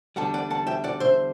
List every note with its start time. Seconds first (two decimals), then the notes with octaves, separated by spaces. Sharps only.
0.16 E2 D3 G3 F#5 A5
0.34 D5 F#5
0.50 F#5 A5
0.67 E5 G5
0.84 D5 F#5
1.00 C5 E5